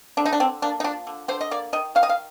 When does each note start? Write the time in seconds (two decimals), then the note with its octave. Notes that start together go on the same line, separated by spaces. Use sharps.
0.17 D3 D4
0.25 D#4
0.33 D4
0.40 D3 C4
0.62 A#3 D4
0.80 D#4
0.84 F3 D4
1.07 D3
1.28 D3 C5
1.41 D#5
1.51 A#3 D5
1.73 D#3 D#5
1.95 D#3 F5
2.03 D#5
2.09 F5